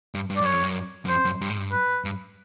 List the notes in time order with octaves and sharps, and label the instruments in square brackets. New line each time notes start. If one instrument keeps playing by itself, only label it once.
[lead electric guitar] G2
G2
[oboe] D5
[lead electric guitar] F#2 [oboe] C#5
[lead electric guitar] F2
F#2
F#2
[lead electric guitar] F2 [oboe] C5
[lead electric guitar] F#2
G2
G#2
G2
[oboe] B4
[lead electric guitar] G2